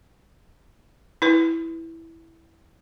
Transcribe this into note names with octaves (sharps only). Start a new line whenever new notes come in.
E4 B4